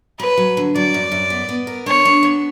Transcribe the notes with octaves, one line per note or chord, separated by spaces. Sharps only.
F#3 B4
F#3
D3
F#3 D5
F#2
F#2
B3
B3
A#4
D4 C#5
D4
B3